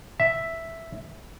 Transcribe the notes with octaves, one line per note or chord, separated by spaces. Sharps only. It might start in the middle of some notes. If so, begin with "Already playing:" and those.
E5